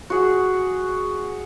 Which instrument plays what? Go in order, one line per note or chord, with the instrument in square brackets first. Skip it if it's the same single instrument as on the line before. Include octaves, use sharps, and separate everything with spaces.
[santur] F#4 G#4